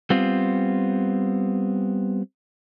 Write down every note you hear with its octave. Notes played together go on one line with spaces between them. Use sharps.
G3 B3 C4 F4